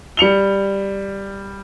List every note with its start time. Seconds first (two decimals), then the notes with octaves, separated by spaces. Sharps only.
0.17 G3 C#7 F7 G7